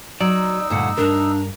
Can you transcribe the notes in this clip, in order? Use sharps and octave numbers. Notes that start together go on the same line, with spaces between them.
F#3 D#4 D5 E6
D2 G2 A#2 F#5
C2 G2 D4 A#4